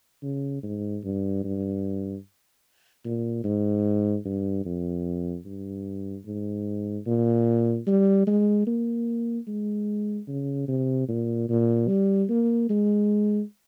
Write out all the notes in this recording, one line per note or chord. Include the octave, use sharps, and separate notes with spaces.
C#3
G#2
G2
G2
A#2
G#2
G2
F2
G2
G#2
A#2
G3
G#3
A#3
G#3
C#3
C3
A#2
A#2
G3
A#3
G#3